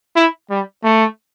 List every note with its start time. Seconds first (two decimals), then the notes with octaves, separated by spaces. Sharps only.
0.16 E4
0.50 G3
0.84 A3